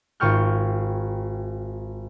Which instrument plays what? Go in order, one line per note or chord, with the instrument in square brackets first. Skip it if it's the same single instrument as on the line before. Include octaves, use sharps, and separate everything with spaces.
[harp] G#1 F4 G5 C#6 F6 G6